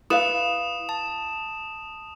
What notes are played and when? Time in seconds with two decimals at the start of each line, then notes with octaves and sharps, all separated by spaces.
0.10 E4 B4 E5 F5 D#6 E7
0.89 A5